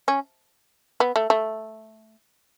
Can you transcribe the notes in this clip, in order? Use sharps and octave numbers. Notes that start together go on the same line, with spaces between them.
C#4
B3
A3
A3